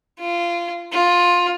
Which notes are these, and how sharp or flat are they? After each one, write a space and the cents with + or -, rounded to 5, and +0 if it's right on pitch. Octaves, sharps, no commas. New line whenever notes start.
F4 -20
F4 +15